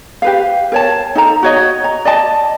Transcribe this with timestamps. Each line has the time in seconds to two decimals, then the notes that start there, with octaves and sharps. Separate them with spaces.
0.22 G4 B4 F5
0.72 A#4 C#5 A5
1.15 D#4 A4 A#5
1.43 F#4 C#5 D#5
1.84 A#5
2.05 D5 D#5 A5